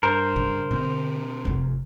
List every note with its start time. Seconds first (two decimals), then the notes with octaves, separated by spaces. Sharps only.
0.03 G2 A#4 C5
0.36 C#3
0.71 B2 D3 C4
1.45 F1 F2